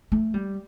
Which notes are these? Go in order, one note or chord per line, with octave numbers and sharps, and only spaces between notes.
A3
G3